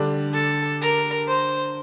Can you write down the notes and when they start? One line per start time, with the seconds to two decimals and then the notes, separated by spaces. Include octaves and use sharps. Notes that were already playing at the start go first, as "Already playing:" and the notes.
Already playing: D3 G3 D4
0.33 A4
0.80 A#4
1.27 C5